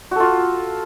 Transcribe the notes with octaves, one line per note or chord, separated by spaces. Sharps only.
F4 F#4 A4